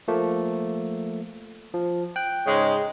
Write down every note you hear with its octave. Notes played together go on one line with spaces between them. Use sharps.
F3 A3 A#3
F3
G5 F#6
G#2 C#3 G#3